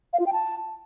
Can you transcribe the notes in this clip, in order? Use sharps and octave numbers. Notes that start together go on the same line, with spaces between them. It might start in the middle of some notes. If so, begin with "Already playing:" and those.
F5
F4
G5
A5